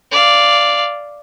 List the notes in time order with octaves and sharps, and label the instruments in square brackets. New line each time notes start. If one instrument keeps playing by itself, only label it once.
[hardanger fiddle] D5 F5